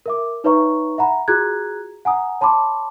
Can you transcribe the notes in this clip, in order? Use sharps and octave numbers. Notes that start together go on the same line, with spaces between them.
A#4 E5 D6
D#4 B4 C#5 E5 A#5 C#6
E5 F#5 A#5 B5
F4 F#4 G#4 A#5 F#6 G#6
F#5 G#5 A#5 D#6
C#5 A5 B5 C6 D6